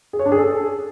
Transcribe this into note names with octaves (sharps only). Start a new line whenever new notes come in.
G#4
C#5
D4
G#4
A4